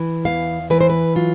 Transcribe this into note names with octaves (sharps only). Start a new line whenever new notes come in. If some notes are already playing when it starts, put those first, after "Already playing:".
Already playing: E3
E2 F5
E3 B4
C5
B4
F#3 F4